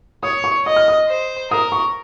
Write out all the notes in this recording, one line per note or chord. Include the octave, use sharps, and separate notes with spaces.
C#5 D#6
C#6
D#5 D#6
F6
D#6
C5
A#4 D#6
C#6